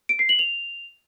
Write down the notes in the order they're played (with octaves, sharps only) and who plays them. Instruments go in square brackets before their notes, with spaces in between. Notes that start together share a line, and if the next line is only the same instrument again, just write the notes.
[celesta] D7
C7
F#7
F7